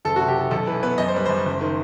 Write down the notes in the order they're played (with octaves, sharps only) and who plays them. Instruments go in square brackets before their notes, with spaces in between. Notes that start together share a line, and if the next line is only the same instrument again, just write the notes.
[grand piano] F#1 A4
C3 F#4
G4
E3 A4
B1 A4
E3 B4
B3 B4
F#2 D#5
C5
G3 B4
F#2 C5
F#1
D#3